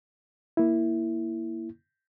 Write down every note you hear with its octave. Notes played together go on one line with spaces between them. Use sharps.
A#3 E4